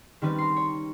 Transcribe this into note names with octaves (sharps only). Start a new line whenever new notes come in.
D#3 G3 C4 C#4 B4
A#5 C6
C#5